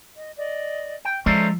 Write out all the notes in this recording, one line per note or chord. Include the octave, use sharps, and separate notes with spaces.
D#5
D5 D#5
G5
F3 G#3 C#4 A4 C5 D5 E5 A#5